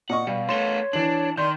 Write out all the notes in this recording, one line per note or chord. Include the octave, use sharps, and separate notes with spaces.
A#2 D#5 F#5 C#6
B2 G3 F5
A3 B3 C#5 C6 E7 G7
E3 D4 A5 F#7
D#3 D5 C6 G6